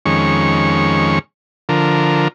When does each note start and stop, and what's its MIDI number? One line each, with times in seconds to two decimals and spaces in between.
0.06 1.19 41
0.06 1.19 51
0.06 1.19 56
0.06 1.19 61
0.06 1.19 85
1.69 2.28 50
1.69 2.28 53
1.69 2.28 70